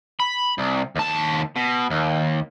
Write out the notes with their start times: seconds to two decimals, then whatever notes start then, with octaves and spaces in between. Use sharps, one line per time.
0.20 B5
0.58 C2
0.96 D#2 A5
1.56 B2
1.90 D#2